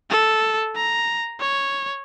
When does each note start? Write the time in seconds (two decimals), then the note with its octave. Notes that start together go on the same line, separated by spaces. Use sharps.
0.10 A4
0.75 A#5
1.40 C#5